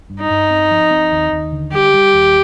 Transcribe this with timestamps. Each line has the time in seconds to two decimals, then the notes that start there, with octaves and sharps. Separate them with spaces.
0.10 G2
0.21 D#4
0.30 G2
0.50 C4
0.71 F3
0.91 C4
1.11 D#2
1.32 D#2
1.52 D3
1.73 G3 G4
1.94 G3
2.13 D#2